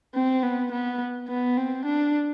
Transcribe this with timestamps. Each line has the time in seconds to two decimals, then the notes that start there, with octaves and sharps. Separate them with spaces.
0.15 C4
0.43 B3
0.72 B3
1.29 B3
1.57 C4
1.85 D4